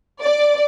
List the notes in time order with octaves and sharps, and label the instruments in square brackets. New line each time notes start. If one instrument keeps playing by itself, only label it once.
[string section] D5